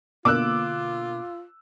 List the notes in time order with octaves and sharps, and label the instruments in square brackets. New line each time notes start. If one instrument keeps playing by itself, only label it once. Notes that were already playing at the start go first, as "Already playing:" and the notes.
[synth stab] B2 D3 A#3 [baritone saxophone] F4 [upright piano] D6 E6 F#6